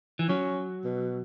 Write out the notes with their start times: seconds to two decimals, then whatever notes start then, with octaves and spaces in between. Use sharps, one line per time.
0.19 E3
0.29 F#3 C#4
0.84 B2